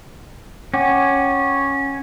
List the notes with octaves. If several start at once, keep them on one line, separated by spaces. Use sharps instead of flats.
C#4 F#5 G5 D6